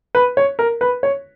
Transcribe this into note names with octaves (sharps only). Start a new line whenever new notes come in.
B4
C#5
A#4
B4
C#5